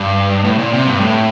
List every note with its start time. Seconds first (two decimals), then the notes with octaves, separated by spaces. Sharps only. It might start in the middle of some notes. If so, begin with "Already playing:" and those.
Already playing: G2
0.44 A2
0.58 A#2
0.73 C3
0.86 G2
1.00 A2